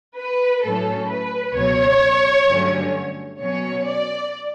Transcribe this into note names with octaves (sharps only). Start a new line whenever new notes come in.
B4
A2 F#3 A3 C#4 A4
B4
C#2 B2 F#3 C#5
G2 D3 F#3 A3 C#4
B2 F#3 C#4 C#5
D5